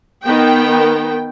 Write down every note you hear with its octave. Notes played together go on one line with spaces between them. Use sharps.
D#3 B3 G5